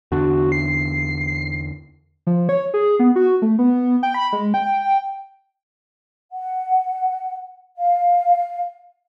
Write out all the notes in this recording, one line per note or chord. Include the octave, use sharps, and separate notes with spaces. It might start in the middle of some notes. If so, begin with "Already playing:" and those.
E2 D3 D4 F#4
C7
F3
C#5
G#4
B3
F#4
A3
B3
G5
B5
G#3
G5
F#5
F5